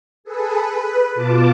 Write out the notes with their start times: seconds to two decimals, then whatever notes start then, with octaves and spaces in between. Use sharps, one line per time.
0.24 G#4 A4 B4
0.60 B4
1.15 B2 F4 A5 D6